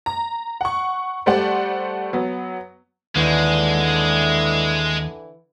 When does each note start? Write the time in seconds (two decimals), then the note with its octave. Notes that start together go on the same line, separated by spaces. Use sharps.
0.06 A#5
0.61 F#5 C#6
1.26 G3 A3 C5 D5 F#5
2.13 F#3 B3
3.16 D#2 D3 E3 G#3